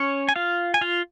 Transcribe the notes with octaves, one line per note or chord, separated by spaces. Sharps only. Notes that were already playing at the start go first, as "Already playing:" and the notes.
Already playing: C#4 C#5
G#5
F4 F5
G#5
F4 F5